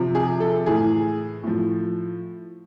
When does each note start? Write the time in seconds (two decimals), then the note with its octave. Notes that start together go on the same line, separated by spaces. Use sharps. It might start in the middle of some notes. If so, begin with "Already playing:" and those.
Already playing: C3 F3
0.15 G#4
0.40 A4
0.66 A2 E3 G#4
1.43 A2 F3